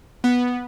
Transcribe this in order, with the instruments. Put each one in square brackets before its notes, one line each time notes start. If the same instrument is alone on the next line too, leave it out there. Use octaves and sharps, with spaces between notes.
[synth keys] B3